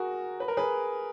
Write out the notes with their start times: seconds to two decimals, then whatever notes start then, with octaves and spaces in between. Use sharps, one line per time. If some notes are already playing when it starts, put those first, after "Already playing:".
Already playing: F#4 G#4 A#4
0.40 B4
0.48 A#4
0.57 G#4 B4